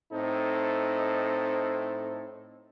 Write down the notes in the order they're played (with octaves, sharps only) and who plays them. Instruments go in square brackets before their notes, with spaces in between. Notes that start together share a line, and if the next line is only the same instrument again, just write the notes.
[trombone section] A2 C4 D#4 A4